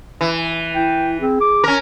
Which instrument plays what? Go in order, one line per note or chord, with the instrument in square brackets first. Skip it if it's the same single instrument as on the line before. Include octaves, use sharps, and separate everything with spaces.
[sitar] E3
[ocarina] E4 [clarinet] G5
[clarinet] C4 [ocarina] G#4
[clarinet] D6
[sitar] C#4 A#4